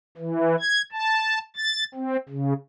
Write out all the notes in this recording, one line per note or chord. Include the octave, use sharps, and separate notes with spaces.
E3
G#6
A5
A6
C4
C#3